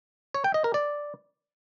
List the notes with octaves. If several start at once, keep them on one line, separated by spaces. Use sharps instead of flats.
C#5
G5
D#5
A#4
D5